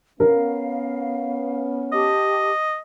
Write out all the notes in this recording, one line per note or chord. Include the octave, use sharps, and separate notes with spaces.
B3 C#4 A#4 F5
G4 D#5 A5 D6